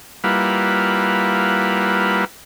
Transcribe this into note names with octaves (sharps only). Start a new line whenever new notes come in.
G3 A#3 E4 F4 B4 F#5